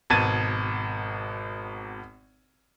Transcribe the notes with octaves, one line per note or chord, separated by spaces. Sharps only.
G#1 B2 A5 G#6 A6 D#7